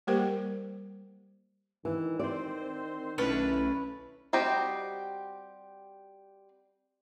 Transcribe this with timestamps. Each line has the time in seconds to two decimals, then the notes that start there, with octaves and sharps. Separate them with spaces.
0.07 G3 A#3 G4 A#4 C5 G5
1.85 D#3 E3
2.19 C4 C5 D5
3.18 B1 A3 C#4 D4 E4 B4
4.33 G3 C4 F#4 G4 D#5